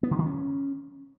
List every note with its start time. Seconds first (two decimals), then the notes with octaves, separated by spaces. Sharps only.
0.03 B3
0.11 D3
0.18 D#3
0.26 C#4